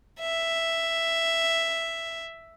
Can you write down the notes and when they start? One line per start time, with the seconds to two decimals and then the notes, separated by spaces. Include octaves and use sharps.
0.20 E5